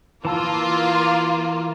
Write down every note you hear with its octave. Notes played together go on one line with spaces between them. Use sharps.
E3 A#3 F4 A5 E6